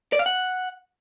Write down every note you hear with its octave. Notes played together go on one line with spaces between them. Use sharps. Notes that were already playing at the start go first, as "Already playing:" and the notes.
D5
F5
F#5